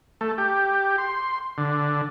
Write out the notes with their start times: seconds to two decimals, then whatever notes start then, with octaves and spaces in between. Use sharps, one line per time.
0.21 A3
0.38 G4
0.98 C6
1.58 D3